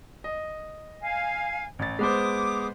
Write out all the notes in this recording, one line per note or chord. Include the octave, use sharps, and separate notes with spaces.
D#5
F5 G#5
A1 A6
G#3 B3 C5 D6 D#6